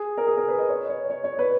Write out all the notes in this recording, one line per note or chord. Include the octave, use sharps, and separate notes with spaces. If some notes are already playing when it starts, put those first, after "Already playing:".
Already playing: G#4
A#4
G#4
A#4
B4
D#5
C#5
C#5
C#5
C#5
B4